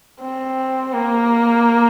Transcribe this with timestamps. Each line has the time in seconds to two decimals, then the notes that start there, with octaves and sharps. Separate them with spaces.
0.21 C4
0.94 A#3